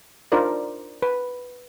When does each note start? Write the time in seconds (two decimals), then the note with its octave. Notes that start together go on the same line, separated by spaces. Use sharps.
0.32 D4 D#4 F4 A#4 C5 D5
1.02 B4